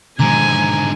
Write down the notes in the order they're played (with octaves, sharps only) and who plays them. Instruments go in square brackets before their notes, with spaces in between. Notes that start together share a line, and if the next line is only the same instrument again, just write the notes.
[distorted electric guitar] G#2 D3 [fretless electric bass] B2 D#3 F3 [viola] G#5 [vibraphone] A#5